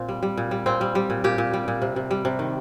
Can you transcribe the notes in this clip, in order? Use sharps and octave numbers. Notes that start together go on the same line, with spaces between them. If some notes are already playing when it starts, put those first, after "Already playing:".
Already playing: A#2 C4
G3
G3
A#2
G3
A#2 C4
G3
G3
A#2
A#2 G4
A#2
G3
A#2
C3
C3
G3
C3
D#3